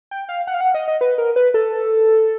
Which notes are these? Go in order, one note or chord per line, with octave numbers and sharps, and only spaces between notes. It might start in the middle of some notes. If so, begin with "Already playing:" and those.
G5
F5
F#5
F5
F#5
D#5
D#5
B4
A#4
B4
A4